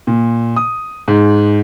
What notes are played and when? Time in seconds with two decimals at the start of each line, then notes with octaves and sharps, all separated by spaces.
0.07 A#2
0.56 D#6
1.08 G#2